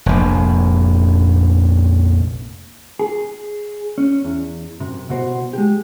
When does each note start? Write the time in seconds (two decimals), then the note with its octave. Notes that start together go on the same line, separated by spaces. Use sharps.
0.06 F1 A#1
2.99 G#4
3.98 C#4
4.24 E2
4.80 F#2 C3
5.09 C2 B2 F#4 C5
5.53 G#3 G4